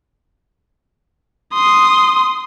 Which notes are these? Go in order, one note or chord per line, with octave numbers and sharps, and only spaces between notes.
C6 D#6